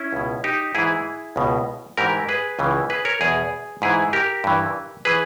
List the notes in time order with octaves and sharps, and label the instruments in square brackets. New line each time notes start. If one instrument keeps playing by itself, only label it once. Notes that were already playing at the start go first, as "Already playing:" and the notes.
Already playing: [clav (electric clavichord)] C#4 E4
C#2 B2
D#4 G4
G#2 E3 E4 G#4
C#2 B2
G#2 E3 G4 A#4
G#4 B4
C#2 C#3 E3
G#4 B4
A#4 C#5
E2 B2 G#4 B4
G#2 E3 E4 G#4
G4 A#4
G2 E3
E3 G#4 B4